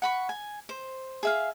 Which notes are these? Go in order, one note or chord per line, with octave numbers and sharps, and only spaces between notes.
F#5 B5 C#6
G#5
C5
G#4 E5 F5